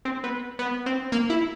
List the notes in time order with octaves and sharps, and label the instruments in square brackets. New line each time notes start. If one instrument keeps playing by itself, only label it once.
[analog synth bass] C4
B3
B3
C4
A#3
E4